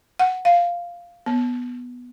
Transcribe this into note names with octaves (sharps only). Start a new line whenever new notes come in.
F#5
F5
B3